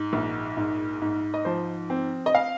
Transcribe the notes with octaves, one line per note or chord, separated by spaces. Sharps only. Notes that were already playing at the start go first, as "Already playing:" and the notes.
Already playing: G#2
A#1
G#2
G#2
D#5
F3 C5
C4
D#5
F5